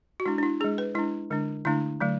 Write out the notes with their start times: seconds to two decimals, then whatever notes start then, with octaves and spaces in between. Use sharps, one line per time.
0.20 F#4
0.26 G#3 D4 E4
0.38 D4
0.43 E4
0.61 G#3 D4 G#4
0.78 B4
0.95 G#3 D4 E4
1.30 D3 G#3 D4
1.65 D3 A3 D4 E4
2.00 D3 F#3 A3